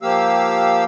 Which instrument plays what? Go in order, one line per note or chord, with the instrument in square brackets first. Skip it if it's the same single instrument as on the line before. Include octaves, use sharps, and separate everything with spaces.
[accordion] F3 A#3 G4 F5 E6